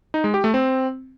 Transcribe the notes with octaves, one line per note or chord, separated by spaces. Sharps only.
D#4
G#3
G4
A3
C4